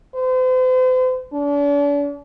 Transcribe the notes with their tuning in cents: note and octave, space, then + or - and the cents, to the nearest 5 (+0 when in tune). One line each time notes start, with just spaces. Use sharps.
C5 -40
D4 -40